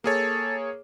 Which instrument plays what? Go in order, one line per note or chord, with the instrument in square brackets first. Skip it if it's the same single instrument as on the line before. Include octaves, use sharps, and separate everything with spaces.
[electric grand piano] A#3 G#4 C#5 [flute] A4